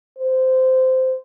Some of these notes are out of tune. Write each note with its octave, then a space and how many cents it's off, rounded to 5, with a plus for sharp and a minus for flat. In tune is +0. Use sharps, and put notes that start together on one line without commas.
C5 -15